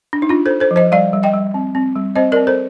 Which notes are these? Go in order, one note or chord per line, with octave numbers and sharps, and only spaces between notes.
D4
D#4
D4 F4
A4 C5
D4
A4 C5
F3
C5 D#5
G3 D5 F5
G3
D#5 G5
G3
C4
C4
G3
C4 C5 D#5
A#4 D5
C4
A4 C5